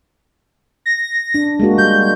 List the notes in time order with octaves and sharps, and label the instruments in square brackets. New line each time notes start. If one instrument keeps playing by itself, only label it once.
[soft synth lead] A#6
[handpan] D4
G#3 A#3 F#4
[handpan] G3 [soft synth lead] G6